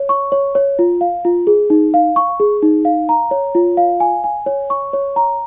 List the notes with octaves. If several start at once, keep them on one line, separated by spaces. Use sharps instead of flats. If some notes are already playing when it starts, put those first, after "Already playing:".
Already playing: C#5
C#6
C#5
C#5
F4
F5
F4
G#4
D#4
F5
C#6
G#4
D#4
F5
A#5
C#5
F4
F5
G#5
G#5
C#5
C#6
C#5
A#5